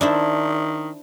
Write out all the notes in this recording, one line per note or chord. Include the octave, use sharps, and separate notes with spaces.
D#3 D4 E4 C5